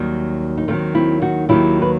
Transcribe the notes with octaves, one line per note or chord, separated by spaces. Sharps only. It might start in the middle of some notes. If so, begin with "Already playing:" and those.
Already playing: D#2 D#3 F#3 G3
D#4
D#2 D#3 F#3 A3 C4
C4 E4
D#4 F#4
D#2 D#3 F#3 E4 G4
B4